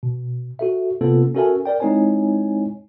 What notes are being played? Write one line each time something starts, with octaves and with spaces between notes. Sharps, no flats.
B2
F#4 A4 E5
C3 A#3 B3 C#4 F4 A4
C#4 F#4 A4 A#4 E5 G#5
A#4 D5 G5
G#3 C4 D#4 E4 C#5 G#5